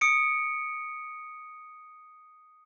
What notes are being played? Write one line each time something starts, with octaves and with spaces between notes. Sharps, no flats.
D#6 C#7 D7